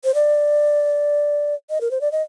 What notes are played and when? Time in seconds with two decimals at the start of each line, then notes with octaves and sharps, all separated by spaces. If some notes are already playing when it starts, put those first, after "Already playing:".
0.04 C5
0.14 D5
1.70 D#5
1.81 A#4
1.91 C5
2.01 D5
2.12 D#5